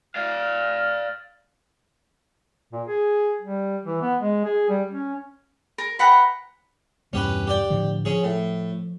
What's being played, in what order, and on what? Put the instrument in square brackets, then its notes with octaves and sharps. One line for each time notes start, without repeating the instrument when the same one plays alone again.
[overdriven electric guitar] D5 F5 [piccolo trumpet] F6
[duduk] A#2
G#4
G3
E3
B3
G#3
G#4
G3
C#4
[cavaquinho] A#4
B4 F#5 G5 A#5
[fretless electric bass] E2 G2 B2 [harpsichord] C#4 G4 B4
[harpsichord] G4 D5 G5
[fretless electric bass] A2 D3 F3
[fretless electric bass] F3 [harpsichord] C#4 G#4
[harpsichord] A2